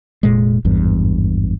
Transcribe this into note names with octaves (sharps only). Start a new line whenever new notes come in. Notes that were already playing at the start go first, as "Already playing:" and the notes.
F1 A#2 G#3
G#1 E2 G2